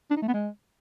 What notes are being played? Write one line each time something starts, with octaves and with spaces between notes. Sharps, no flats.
D4
D#4
A3
B3
G#3